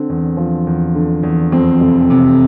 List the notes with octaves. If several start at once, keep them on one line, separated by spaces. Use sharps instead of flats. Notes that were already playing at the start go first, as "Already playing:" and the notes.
Already playing: D3 C4
E2
F3
E2
D3
E2
F2 C4
F1
C3